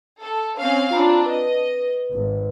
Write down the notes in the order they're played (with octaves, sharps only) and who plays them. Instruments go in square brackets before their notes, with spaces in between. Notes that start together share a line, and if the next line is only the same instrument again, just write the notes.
[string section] A4
C4 C#4 F5
[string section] C4 D4 [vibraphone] F4 A#5 B5
[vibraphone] B4 [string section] D#5
[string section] G#1